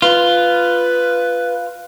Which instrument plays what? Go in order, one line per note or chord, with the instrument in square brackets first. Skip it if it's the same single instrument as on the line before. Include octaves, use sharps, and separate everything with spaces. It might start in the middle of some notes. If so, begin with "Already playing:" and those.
[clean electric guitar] F4 [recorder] B4